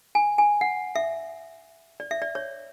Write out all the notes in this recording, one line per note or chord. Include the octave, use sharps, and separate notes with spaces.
G#5
G#5
F#5
E5
D5
E5
D5
C#5